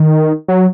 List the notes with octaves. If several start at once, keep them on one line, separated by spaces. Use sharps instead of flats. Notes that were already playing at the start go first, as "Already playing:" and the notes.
Already playing: D#3
F#3